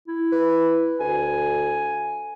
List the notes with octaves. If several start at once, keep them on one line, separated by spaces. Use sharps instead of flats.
E4
B4
D2 G#5